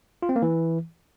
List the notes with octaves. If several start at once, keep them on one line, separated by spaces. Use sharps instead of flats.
F4
C4
A#3
E3